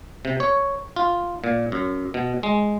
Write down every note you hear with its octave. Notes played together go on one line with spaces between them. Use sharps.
C3
C#5
F4
A#2
F#2
B2
G#3